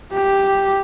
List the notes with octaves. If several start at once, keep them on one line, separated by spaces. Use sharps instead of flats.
G4